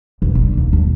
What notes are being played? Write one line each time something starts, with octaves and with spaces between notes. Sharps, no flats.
E1
D3
D#2
E1